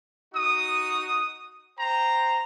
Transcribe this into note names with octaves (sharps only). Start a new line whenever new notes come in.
D#4 F#4 D#6
C5 G5 A#5